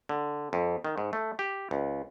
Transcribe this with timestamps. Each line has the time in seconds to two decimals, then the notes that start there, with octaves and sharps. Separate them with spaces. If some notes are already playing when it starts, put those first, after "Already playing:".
0.09 D3
0.53 F2
0.85 D#3
0.98 G#2
1.13 A3
1.39 G4
1.71 C#2